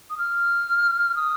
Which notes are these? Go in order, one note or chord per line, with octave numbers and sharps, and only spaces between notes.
D#6
F6
D#6